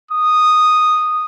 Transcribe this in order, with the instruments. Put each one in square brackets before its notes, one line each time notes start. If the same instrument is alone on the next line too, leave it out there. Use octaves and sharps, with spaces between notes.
[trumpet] D#6